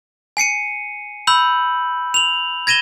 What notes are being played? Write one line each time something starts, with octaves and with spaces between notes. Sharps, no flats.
G#5 C7 C#7 D#7
B5 E6 G6 F#7
F7 F#7
G#6 A#6 D#7 E7 G7